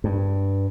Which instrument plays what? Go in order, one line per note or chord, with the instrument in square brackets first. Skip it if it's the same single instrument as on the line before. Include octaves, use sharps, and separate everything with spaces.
[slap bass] G2